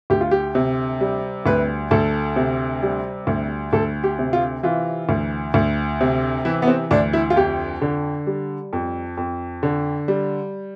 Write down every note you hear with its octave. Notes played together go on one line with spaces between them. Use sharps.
D2 G4
F4
G4
C3
G3
D2 B4
D2 A4
C3
G3
D2
D2 A4
G4
C3
F4
E3 F4
D2
D2
C3
E3 E4
B3
C4
D2 D4
E4
F4
F2 G4
D3
G3
F2
F2
D3
G3